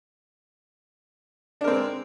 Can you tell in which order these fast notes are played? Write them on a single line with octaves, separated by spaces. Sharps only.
D4 A#4 C4 G#3